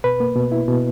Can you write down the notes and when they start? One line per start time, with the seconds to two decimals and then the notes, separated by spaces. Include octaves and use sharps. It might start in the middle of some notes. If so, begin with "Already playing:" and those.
0.04 B2 B4
0.20 A#3
0.36 B2
0.52 E4
0.68 B2